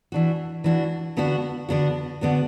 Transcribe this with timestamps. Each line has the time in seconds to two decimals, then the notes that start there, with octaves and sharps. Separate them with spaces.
0.12 E3 D4 F#4
0.64 E3 D4 F#4
1.17 D3 B3 D4 F#4
1.69 D3 B3 D4 F#4
2.21 D3 B3 D4 F#4